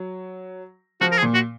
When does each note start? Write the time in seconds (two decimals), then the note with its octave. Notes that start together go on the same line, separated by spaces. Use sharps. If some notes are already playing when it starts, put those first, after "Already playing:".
Already playing: F#3
1.01 F3 F#4
1.12 A#4
1.18 G#4
1.23 A#2
1.34 F#4